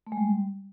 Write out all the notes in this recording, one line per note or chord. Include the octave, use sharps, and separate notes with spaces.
A3
G#3
G3